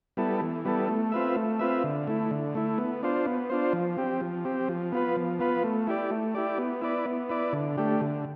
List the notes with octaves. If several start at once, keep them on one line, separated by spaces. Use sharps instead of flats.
G3 B3 E4 A4
E3
G3 B3 E4 A4
A3
C4 F4 B4 E5
A3
C4 F4 B4 E5
D3
A3 E4
D3
A3 E4
B3
D4 F4 C5
B3
D4 F4 C5
F3
C4 G4
F3
C4 G4
F3
B3 F4 B4
F3
B3 F4 B4
A3
E4 G4 D5
A3
E4 G4 D5
B3
E4 B4 D5
B3
E4 B4 D5
D3
A3 D4 G4
D3